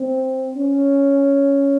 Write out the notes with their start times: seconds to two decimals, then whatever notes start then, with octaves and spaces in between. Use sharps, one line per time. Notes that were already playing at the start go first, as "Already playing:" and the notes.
Already playing: C4
0.56 C#4